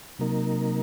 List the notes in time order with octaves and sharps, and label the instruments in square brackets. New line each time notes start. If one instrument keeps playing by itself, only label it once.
[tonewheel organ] C3 F#3 A#3 D#4 A#4